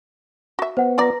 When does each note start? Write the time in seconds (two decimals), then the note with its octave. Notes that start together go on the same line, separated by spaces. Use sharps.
0.59 F#4 E5
0.77 B3 C5 F#5
0.98 F3 F4 B4 D5 A#5 A#6